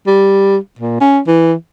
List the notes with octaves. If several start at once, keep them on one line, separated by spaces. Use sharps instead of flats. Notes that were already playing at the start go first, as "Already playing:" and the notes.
G3
A#2
C#4
E3